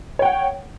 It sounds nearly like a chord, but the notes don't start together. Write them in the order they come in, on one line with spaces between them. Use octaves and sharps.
C#5 G5 F#5